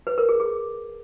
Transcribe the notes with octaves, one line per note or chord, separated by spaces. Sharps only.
B4
A#4
G#4
G#4